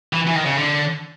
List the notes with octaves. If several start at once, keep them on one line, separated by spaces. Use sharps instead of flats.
E3
E3
D#3
C#3
D3